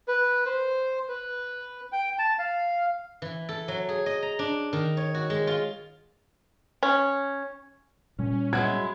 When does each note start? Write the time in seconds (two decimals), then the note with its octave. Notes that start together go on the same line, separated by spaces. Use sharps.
0.08 B4
0.46 C5
1.09 B4
1.92 G5
2.19 A5
2.39 F5
3.22 E3
3.49 A4
3.68 F#3
3.89 G#4
4.06 D#5
4.22 A#5
4.39 D4
4.73 D#3
4.97 C#5
5.14 F#4
5.30 G#3
5.47 F4
6.83 C#4
8.19 A#2 G3 C#4
8.53 F#3 G#3 E4 G#6